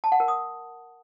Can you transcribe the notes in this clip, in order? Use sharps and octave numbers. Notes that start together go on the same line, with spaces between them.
A5
F#5
A#4
D#6